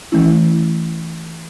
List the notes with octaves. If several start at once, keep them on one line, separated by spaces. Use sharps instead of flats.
E3 A3 C#4 E4